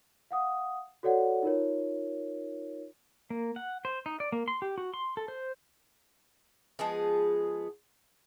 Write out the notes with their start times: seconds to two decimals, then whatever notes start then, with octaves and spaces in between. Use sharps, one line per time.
0.31 F5 F#5 D#6
1.03 F#4 A4 C#5 D5 F#5
1.43 D#4 F4 A#4 C#5
3.30 A#3
3.56 F#5
3.85 C5
4.06 D#4
4.20 D5
4.32 A#3
4.48 C6
4.62 G4
4.78 F#4
4.94 C6
5.17 A4
5.28 C5
6.79 F3 G#3 B3 G#4